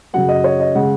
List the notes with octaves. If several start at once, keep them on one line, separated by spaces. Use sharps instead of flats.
F#2 C#3 F#3 F#5
D#5
C#5
D#5
C#3 G#3 F#5